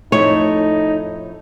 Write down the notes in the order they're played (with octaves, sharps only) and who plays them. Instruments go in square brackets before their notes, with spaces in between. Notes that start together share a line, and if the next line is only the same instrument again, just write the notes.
[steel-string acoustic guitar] F2 A2 A3 [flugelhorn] D#4 [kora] C#5